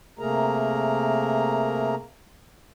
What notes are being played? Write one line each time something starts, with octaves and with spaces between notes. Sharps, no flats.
C3 A3 A#3 G#4 A#4 A#5